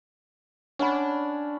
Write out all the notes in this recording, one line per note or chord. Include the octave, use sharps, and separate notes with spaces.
C#4 D4 F#5 B5